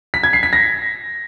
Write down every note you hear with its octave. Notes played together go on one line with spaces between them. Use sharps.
B6
G#6
C7
B6
A#6